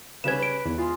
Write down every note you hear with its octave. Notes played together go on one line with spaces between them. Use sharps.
C#3 G3 C#4 B4 G#6 E7
D7
E2 E3
G#3 F4